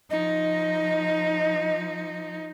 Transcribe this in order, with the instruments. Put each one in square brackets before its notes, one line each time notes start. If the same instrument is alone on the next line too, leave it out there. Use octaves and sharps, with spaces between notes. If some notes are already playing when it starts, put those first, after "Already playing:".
[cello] F3 D#4 [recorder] D#5